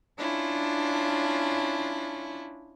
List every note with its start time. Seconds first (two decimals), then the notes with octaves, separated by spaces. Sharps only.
0.19 C#4 D4 E4 F4